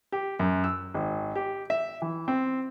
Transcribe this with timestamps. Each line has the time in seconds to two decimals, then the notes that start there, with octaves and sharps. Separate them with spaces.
0.12 G4
0.39 F#2
0.64 E6
0.94 G#1
1.35 G4
1.70 E5
2.02 E3
2.28 C4